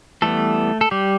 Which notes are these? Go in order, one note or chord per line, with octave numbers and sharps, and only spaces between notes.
E3 G3 A3 B3 A4
A4
G3 G4